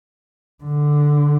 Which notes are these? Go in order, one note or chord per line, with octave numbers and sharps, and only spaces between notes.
D3